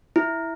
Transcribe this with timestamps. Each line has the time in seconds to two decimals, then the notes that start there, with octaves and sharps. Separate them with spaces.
0.16 E4